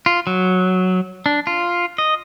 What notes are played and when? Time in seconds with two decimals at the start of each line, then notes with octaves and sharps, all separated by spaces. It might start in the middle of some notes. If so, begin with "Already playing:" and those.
0.06 F4
0.27 F#3
1.26 D4
1.47 F4
1.98 D#5